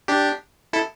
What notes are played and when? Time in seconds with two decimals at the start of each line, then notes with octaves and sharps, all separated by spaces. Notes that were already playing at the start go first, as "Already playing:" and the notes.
0.08 D4 G4
0.73 E4 A4